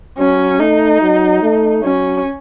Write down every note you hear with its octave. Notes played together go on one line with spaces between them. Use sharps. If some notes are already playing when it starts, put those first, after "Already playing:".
F#3 C#4
A3 D#4
F#3
A3
F#3 C#4